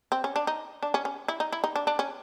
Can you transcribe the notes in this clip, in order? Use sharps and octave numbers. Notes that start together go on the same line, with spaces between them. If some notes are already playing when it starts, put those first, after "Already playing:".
C4
C#4
D4
D#4
D4
C#4
C#4
E4
D#4
E4
D#4
D4
D4
C#4